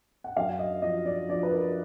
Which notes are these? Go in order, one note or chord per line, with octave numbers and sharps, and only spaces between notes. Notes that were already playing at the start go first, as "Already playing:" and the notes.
F#5
F#2 F5
D#5
F3 D#5
D5
F3 D5
B4
A#4